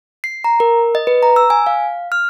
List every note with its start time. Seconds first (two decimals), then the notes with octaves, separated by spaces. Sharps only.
0.24 C7
0.44 A#5
0.60 A#4
0.95 D#5
1.07 B4
1.23 A#5
1.36 E6
1.50 G#5
1.67 F5
2.12 F6